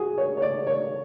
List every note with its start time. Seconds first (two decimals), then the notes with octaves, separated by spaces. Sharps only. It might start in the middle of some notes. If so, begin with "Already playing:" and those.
Already playing: F#4 G#4
0.18 C#5
0.37 C#5
0.42 D5
0.67 C#5